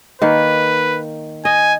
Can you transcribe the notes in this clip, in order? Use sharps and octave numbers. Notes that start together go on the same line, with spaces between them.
D#3 A#3 B4
D#5 G#5